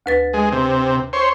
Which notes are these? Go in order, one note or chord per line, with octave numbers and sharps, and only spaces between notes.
D2 B4 A6
G#3
C3
C5 C#5